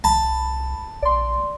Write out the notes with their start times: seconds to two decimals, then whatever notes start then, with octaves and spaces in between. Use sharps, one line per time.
0.04 C2 A5 B5
1.03 A#1 D5 C6